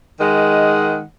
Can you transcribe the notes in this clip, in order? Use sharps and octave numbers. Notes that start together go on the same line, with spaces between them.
D#3 G#3 D#5 F#5